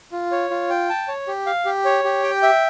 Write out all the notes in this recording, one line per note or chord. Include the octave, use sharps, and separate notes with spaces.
F4
C#5
F4
G5
A5
C#5
G4
F5
G4
C#5
G4
G5
E5